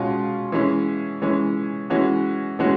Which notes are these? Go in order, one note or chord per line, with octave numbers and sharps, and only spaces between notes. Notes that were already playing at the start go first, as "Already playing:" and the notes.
Already playing: B2 G#3 C#4 F4
E3 G#3 C#4
E3 G#3 C#4
E3 G#3 C#4 F#4
E3 G#3 C#4 F#4